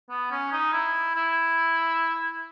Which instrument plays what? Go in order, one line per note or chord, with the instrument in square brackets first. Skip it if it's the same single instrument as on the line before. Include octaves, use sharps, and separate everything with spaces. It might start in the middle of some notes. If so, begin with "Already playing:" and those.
[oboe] B3
C#4
D#4
E4
E4